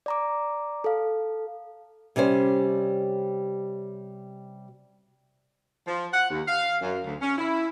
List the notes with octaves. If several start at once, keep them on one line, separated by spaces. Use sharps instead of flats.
D5 A#5 D6
A4 F5
C3 G3 C#4 C5
F3
F#5
D#2
F5
F#2
D2
C#4
E4